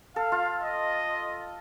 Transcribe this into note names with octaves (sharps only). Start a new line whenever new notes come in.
A4 F5
F4
D#5